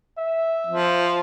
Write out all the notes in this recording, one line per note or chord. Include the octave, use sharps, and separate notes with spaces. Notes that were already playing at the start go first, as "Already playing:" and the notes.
E5
F3